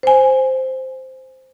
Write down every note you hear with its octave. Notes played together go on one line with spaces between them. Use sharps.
C5 G#5